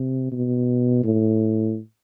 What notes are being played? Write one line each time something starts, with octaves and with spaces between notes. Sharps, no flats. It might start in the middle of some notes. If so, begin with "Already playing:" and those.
Already playing: C3
B2
A2